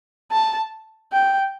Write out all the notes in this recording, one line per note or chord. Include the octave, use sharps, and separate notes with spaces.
A5
G5